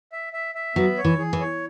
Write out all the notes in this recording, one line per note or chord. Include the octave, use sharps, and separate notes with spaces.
E5
E5
E5
F#3 B3
C#5
E3
G#4
E3
C#5